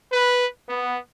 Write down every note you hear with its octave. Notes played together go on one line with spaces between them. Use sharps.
B4
B3